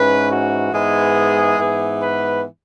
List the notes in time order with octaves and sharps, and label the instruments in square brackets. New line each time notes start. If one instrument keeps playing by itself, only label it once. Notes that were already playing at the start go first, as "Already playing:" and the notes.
Already playing: [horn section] G#2 E3 C#4 B4
F#4
G#2 E3 G#3 B3 G#4
G#2 E3 B3
B4